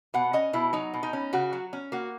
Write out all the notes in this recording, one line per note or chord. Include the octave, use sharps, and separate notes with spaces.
B2 F#5
C#4 D#5
B2 E4
F#3 D#4
B2
D#4
C#4
C#3 F#4
F#3
C#4
A#3 F#4